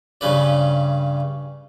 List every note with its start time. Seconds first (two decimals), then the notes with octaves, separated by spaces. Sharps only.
0.21 G2 C#3 B4 D5